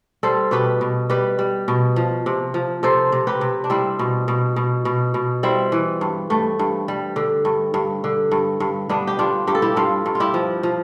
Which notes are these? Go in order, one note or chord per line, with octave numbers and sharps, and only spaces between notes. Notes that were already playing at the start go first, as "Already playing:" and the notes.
G3 A4 C5
B2 G4 B4
B2
G3 G4 B4
G3
B2
F3
C3
F3
C3 A4 C5
C3
G4 B4
C3
D4
G3 C4 E4
B2
B2
B2
B2
B2
G3 C4 E4
E3
G2
G2 A3
G2
G3
D3
G2
G2
D3
G2
G2
G2 B3 D4
G4
G2 D4 F4
G2 G4
A4
E4 G4
G2 F4 A4
G2
F4
E4 G4
F3
F3